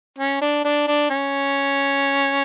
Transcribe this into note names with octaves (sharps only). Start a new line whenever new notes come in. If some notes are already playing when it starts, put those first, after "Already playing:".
C#4
D4
D4
D4
C#4